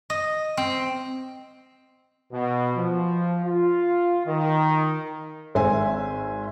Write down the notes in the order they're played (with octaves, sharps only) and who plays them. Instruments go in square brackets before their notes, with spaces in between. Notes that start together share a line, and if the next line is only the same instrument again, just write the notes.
[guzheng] D#5
C4
[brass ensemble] B2
F3
F4
D#3
[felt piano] G#1 C5 E5 G#5